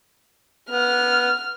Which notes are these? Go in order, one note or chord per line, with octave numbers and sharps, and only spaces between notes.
B3 F6